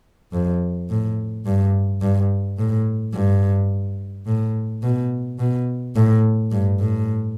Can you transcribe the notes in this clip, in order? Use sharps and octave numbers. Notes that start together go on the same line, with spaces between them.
F2
A2
G2
G2
A2
G2
A2
B2
B2
A2
G2
A2